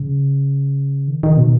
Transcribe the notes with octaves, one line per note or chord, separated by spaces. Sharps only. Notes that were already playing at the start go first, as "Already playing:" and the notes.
Already playing: C#3
D#3
D#3
B2